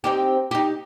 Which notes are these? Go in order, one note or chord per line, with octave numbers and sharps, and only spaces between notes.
C4 D#4 G4
D#4 G4